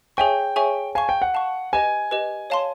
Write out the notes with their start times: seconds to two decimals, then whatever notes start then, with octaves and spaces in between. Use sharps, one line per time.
0.17 G#4 C#5 E5 G5 G#5 C#6
0.56 G#4 C#5 E5 G#5 C#6
0.95 F5 G#5 A5 C#6
1.09 G5
1.22 F#5
1.34 F5 A5 C#6
1.73 G4 B4 D#5 G#5
2.11 G4 B4 D#5
2.50 C#5 F5 A5 C6